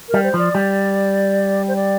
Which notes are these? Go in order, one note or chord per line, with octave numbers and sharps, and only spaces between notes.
A#4
G3
C5
F3 D5
G3
C5
D5